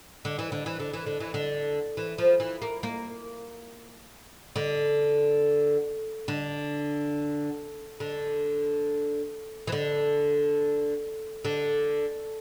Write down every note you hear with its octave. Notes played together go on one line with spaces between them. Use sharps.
D3
E3
D3
E3
D3
E3
D3
E3
D3
E3
F3
E3
A#3
A#3
D3
D3
D3
E3
D3
D3